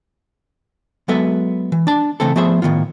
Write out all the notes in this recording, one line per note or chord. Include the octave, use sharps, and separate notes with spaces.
F#3 G#3 B3 A4 B4 E5
E3
D4 A5
C#3 E3 A3 C4 A4
F3 A3 B3 G#4 C5 E5
A2 D#3 B3 F4